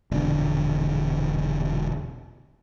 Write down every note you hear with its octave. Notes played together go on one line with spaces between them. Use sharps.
E1 A#1 D3